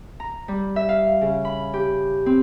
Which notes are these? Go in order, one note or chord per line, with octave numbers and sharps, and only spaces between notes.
A#5
G3
E5
F5
C#3
B5
G4
C4